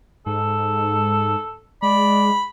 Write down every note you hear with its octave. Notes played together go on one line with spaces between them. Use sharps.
G#2 A4
G#3 D5 B5